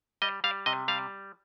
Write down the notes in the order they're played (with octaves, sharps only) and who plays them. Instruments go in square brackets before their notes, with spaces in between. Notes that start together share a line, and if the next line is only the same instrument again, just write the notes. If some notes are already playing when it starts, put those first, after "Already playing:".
[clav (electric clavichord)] G3 D#5
G3 F5
C3 D#5
G3 F5